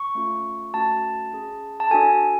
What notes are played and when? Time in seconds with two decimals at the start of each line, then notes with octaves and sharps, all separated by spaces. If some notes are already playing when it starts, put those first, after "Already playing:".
Already playing: C#6
0.15 A3 C#4 F4
0.73 A3 C#4 F#4 A5
1.32 C#4 G#4
1.80 A5
1.91 D4 F#4 A4 G#5